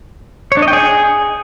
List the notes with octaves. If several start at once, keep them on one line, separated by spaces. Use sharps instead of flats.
C#5
D4
D#5
G5
G#4